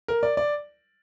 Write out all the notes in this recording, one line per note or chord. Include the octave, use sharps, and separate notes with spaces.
A#4
D5
D5